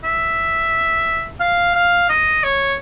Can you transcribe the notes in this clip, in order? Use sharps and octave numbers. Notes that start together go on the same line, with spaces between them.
E5
F5
F5
D#5
C#5